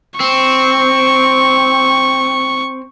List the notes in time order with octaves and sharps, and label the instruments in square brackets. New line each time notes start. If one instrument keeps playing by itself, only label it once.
[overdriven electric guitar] C4 [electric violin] C#6